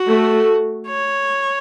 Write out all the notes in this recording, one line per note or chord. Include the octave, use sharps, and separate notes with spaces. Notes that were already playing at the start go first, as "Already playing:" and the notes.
Already playing: F#4
A3
C#5